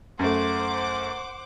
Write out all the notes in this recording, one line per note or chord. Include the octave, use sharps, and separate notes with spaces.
F#2 A3 C5 F#5 D6